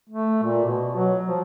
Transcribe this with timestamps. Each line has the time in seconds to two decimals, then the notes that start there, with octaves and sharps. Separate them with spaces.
0.09 A3
0.43 A#2
0.65 B2
0.95 F#3
1.28 F3